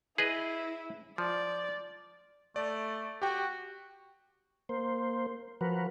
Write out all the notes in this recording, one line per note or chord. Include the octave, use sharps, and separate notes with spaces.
E4 G#4 B4 D#5
F3 D5
A3 D5
F#4 G4 G5
A#3 C5
F3 F#4 A#4 B4